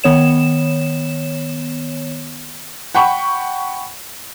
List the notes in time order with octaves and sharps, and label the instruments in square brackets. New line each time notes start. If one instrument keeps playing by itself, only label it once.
[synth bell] D#3 B3 C#5 E7
[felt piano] F#5 G5 B5 C#6